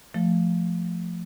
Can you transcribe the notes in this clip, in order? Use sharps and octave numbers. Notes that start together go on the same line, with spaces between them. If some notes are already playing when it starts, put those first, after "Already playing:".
F3 A3